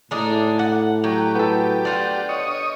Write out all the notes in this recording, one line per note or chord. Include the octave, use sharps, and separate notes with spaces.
A2 G#3 D4 D#4
F#5
F#3 G4
B3 A4
D4 F4 F#5
C#5 D#5